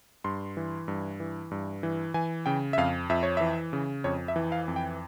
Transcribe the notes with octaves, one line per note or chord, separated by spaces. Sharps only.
G2 C6
E3
G2
E3
G2
E3
E3 G#5
C#3 G5
E5
F2 F5
F2 E5
C#5
E3 E5
C#3
F2 C#5
E5
E3
F5
F2
G5